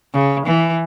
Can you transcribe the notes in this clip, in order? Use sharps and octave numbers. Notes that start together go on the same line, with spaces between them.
C#3
E3